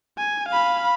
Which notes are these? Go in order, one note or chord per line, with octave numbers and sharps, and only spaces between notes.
G#5
F5 B5